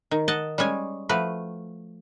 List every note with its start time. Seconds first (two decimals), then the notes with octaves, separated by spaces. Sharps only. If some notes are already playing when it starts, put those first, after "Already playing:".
0.11 D#3
0.28 D#5 F#5 A5
0.58 G3 G#3 C#4 G#5
1.09 F3 A3 F#4 B4